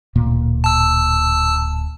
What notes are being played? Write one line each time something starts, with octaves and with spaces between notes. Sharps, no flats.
D1 A#2 A#3
A5 E6